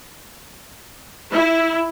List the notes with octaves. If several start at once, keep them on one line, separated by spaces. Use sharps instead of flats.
E4